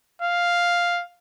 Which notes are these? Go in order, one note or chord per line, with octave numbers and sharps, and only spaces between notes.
F5